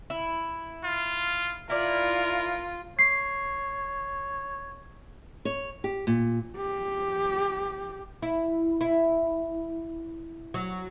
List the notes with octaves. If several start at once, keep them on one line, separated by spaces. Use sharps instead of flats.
E4
F4
E4 F4 A#4 D5
C#5 C7
C#5
G4
A#2
G4
E4
E4
F#3